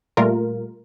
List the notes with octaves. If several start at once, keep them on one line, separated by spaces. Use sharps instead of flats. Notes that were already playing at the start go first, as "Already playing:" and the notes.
A#2 G3 A3 F4 A#4